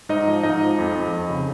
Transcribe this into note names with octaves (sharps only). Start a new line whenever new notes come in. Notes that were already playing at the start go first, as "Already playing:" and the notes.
G#2 D#4 D#5
F3
G#2 D#4 D#5
F3
F2
F2
F2
C#3